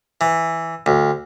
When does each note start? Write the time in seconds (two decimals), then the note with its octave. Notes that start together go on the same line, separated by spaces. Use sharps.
0.21 E3
0.86 D2